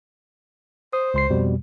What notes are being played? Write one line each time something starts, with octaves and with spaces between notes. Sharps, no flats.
C5 D#6
C#2 C6 C7
F2 B2 G3